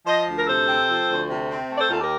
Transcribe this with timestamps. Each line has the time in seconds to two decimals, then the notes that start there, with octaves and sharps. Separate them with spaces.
0.06 F3 C5 D#5
0.28 D2
0.36 A#4
0.47 C3 A4 C5
0.69 C4
0.89 F3
1.09 D2
1.30 C3
1.50 C4
1.70 A3
1.75 D5
1.80 A4 C5
1.91 D#2 F4 A4
2.01 G4 A#4